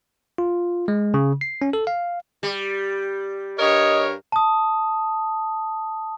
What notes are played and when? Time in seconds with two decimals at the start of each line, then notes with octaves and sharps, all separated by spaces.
0.38 F4
0.88 G#3
1.14 C#3
1.41 C7
1.62 C#4
1.73 A4
1.87 F5
2.43 G3
3.59 G2 A#4 C#5 D#5
4.32 A5 D#6